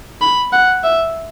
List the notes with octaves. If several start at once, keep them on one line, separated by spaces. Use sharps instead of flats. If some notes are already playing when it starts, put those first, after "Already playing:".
B5
F#5
E5